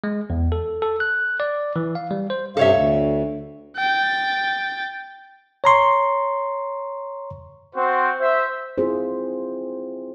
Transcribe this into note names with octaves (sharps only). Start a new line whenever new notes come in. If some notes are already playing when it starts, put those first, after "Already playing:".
G#3
E2
A4
A4
F#6
D5
E3
F5
G3
C5
G2 C3 A4 C#5 E5 F5
D2
G5 A6
C#5 A#5 C6 C#6
C4 F#4 C5
C5 E5
C4 E4 F4 G#4 C5